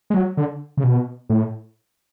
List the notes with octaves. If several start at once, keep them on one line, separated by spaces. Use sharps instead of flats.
G#3
F#3
D3
C#3
B2
A2